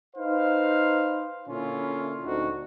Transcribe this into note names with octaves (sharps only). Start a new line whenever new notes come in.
D#4 B4 C5 F5
A#2 D3 C#4 E4 F4
D2 C4 D#4 F#4